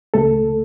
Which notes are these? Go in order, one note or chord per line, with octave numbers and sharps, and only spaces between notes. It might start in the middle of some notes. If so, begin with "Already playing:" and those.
C#2 A3 A4